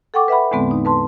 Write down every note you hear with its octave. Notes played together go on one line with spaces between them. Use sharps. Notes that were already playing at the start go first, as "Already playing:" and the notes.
A4 F#5 G5 C#6 D6
B4 E5 F#5 B5
E2 A2 D3 G#3 B3 C4
D#4
B4 A5 C6